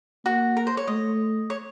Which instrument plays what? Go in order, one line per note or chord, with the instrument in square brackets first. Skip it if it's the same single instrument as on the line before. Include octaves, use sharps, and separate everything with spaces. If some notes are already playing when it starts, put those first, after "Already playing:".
[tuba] A#3 [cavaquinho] F#4
[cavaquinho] A#4
C5
C#5
[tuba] A3 [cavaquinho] D#5
[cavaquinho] C#5